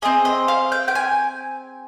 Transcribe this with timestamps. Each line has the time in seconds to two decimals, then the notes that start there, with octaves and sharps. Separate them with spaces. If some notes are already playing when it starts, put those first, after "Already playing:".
0.02 C4 F4 G#4 D#5
0.25 D#5
0.48 F5
0.72 G5
0.88 G5
0.95 G#5